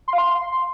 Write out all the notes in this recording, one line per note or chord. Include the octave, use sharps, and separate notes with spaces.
C6
F5
C6